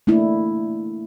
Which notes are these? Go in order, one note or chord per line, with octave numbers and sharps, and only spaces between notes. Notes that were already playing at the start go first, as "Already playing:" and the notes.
A3 A#3 D4 E4